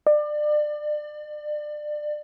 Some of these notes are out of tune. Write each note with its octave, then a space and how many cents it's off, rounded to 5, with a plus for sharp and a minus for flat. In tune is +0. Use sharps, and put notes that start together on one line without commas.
D5 +30